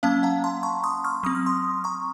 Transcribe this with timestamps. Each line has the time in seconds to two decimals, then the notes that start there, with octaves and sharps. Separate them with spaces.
0.03 F#3 A#3 C#4 F5 A5
0.23 F#5 A#5
0.44 A5 C6
0.63 A#5 C#6
0.84 C6 D#6
1.04 C#6 F6
1.23 F#3 C4 D#6
1.35 F6
1.46 C6 D#6
1.84 A#5 C#6